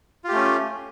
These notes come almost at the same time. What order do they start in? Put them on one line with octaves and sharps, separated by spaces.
F4 G4 A3 C#4